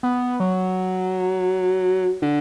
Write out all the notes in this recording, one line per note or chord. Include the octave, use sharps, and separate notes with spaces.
B3
F#3
D3